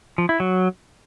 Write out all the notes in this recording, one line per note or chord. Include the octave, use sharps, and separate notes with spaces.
F3
E4
F#3